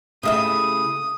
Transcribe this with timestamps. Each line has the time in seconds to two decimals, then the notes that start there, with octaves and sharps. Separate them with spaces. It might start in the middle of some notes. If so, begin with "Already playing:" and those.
0.23 C#3 A3 E4 G4 D#5 E5 D#6